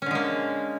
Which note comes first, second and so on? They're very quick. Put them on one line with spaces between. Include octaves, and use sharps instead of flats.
C#4 D3 G#3 A#3